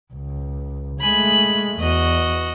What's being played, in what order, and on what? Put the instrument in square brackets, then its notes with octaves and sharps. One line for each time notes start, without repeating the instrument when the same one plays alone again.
[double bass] C#2
[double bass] G#3 A3 [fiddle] G#5 B5
[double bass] E2 [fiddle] F#4 D#5